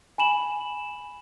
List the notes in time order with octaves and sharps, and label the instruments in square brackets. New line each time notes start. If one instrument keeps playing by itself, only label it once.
[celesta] G#5 B5 E7 F#7